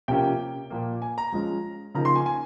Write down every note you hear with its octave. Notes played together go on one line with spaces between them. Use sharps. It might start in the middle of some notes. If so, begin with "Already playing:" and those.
C3 F3 A#3 C#4 G5
A#2 F3 A#3
G#5
A#5
F3 G#3 C#4
C#3 F3 A#3 D#4 A#5
C6
G#5
G#5